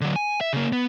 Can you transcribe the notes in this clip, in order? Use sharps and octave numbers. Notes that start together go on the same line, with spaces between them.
D3 F#3
G#5
E5
C#3 A#3
B3